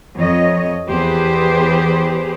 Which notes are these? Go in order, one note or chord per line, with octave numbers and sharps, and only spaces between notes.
F2 C#5 D#5
E2 G4 G#4 B4 C5